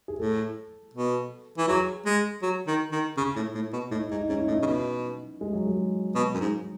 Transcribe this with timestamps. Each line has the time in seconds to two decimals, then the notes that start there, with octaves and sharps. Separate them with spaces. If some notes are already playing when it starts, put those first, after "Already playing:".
0.08 G#4
0.19 A2 A4
0.94 B2
1.58 E3
1.68 F#3 G#4
2.06 G#3
2.42 F#3
2.67 D#3
2.92 D#3
3.17 C#3
3.36 A2
3.54 A2
3.73 B2
3.91 A2 D#4
4.11 G#2 D#4
4.23 D#4
4.29 G#2 C#4
4.39 E4
4.48 A2 D#4
4.62 C#3
4.66 B2
5.41 G#3
5.53 F#3
5.67 G#3
6.15 B2
6.34 F#2
6.40 G#2